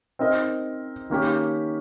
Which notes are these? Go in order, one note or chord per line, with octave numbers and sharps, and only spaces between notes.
C4 D#4 A#4 D#5
D#3 A#3 C#4 G4